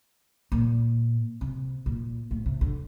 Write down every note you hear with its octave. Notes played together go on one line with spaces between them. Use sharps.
A#2
C3
A#2
A2
C3
D3